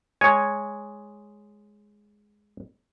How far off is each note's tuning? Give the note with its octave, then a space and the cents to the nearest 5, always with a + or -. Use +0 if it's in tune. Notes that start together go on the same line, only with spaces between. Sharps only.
G#3 +0 C#5 +0 G#5 +0